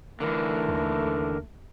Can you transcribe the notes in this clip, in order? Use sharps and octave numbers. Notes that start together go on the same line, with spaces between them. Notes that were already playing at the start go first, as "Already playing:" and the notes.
D3 E3 A3 A#4
D#2